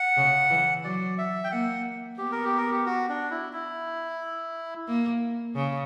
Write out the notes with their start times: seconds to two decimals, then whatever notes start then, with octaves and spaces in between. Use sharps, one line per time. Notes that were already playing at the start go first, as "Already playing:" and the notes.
Already playing: F#5
0.17 C#3
0.50 E3
0.84 F#3 D5
1.18 E5
1.44 G5
1.52 A#3 F#5
2.18 B3 G4
2.32 A#4
2.45 G4
2.57 A#4
2.71 G4
2.86 F#4
3.09 D4
3.31 E4
3.53 E4
4.88 A#3
5.56 C#3